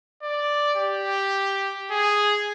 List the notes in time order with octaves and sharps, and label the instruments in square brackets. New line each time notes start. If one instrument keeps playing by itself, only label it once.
[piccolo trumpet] D5
G4
G#4